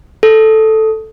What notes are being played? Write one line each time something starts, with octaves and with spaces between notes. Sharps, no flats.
A4